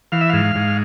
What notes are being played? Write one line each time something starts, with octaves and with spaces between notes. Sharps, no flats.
E3 F5
E5
G#2 F5
G#2